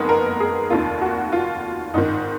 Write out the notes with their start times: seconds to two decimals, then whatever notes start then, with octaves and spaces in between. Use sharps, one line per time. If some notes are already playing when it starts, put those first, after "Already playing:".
Already playing: F#1 F2 D#3 G#3 A#3 B3
0.09 A#4
0.40 G#4
0.70 F1 D#2 D#3 F4
1.01 F#4
1.32 F4
1.93 G#1 G#2 D#3 D#4